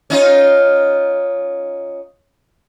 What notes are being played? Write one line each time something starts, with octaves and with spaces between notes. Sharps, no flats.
C#4 D#4 F4